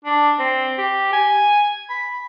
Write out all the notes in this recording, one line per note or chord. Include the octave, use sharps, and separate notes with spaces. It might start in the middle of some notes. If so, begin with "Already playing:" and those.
D4
C4
G4
G#5
B5